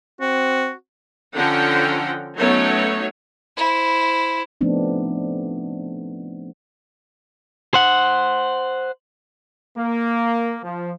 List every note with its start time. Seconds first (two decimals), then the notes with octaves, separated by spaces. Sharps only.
0.21 C4 F#4
1.34 D3 F3 C#4 F#5 G5 A#5
2.37 F#3 A3 B3 C#4 D#4 C#5
3.57 E4 C5
4.61 F3 A3 B3 C4 D4 D#4
7.74 C5 F#5
9.76 A#3
10.63 F3